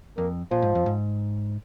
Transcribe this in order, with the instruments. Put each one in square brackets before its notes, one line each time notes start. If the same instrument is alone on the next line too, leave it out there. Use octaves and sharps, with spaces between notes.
[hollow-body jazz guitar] F2 [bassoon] A#3
[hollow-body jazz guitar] A#2 [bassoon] F3
[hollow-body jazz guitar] G#2
F2
G#2